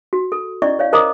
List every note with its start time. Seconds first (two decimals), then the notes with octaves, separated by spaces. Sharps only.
0.13 F#4
0.32 A4
0.62 C#4 E4 D5 D#5 C#6
0.79 C#5 D5 F5
0.93 A#4 C5 D#5 A#5 D6 D#6